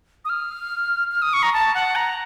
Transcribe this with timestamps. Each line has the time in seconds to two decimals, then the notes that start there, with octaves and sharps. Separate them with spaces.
0.25 D#6
0.29 F6
1.12 F6
1.22 D#6
1.33 C#6
1.43 A#5
1.53 A5
1.75 F#5
1.95 A#5